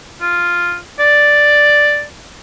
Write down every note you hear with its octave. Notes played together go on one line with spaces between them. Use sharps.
F4
D5